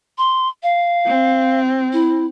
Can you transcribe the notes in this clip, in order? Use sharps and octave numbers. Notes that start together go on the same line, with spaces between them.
C6
F5
C4
E4